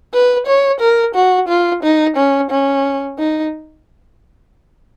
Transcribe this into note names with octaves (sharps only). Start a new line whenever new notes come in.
B4
C#5
A#4
F#4
F4
D#4
C#4
C#4
D#4